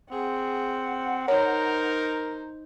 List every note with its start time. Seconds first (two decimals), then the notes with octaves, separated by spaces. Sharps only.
0.12 C4 G#4 F#5
1.28 D#4 A#4 C5 C#5